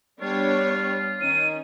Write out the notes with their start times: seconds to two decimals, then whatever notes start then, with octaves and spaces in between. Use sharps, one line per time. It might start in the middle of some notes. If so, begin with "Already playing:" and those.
0.22 G3 B3 D4 F4 C#5
1.21 D#3 C#4 D#4 D#7